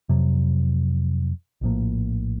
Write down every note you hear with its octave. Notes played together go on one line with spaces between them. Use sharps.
F2 C3 F#3
A#1 A2 F3 A#3